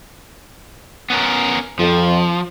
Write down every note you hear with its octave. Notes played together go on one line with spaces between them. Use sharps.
B3 C#4 A#4
F2 F3